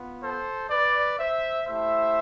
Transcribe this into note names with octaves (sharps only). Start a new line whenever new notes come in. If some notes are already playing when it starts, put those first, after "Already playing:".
Already playing: B3 F4
A4 C5
B4 D5
C5 E5
A3 E4 G4 C5 E5